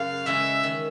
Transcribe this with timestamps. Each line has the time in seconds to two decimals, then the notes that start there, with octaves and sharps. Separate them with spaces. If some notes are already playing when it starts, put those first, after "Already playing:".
Already playing: F#2 C#3 C#4 F5
0.26 C#3 E3 G#3 C#4 E5
0.63 D#3